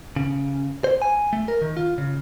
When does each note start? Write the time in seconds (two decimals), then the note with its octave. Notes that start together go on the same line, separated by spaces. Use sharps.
0.16 C#3
0.84 C5
1.02 G#5
1.33 A3
1.48 A#4
1.62 D#3
1.77 F4
1.98 C#3